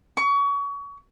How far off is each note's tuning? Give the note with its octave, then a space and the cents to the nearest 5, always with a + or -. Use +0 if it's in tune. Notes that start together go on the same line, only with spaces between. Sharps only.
C#6 +30